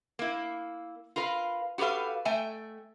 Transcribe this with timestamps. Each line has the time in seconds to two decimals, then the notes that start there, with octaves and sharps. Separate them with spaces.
0.19 A#3 E4
1.16 F4 A#4 B4 F5
1.78 F#4 G4 A4 B4 F5
2.25 A3 E5 G5 G#5